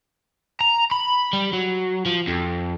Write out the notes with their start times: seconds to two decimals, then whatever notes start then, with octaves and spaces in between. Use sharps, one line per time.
0.61 A#5
0.91 B5
1.33 G3
1.53 F#3
2.06 F3
2.28 F2